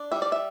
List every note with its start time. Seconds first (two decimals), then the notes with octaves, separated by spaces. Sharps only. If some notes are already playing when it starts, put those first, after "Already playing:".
Already playing: D4
0.12 G3 E5
0.22 D5
0.32 E5